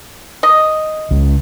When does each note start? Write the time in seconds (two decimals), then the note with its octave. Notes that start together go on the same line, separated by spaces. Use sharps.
0.43 D#5
1.11 C#2